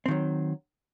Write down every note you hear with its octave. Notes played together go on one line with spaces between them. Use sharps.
D#3 F#3 C4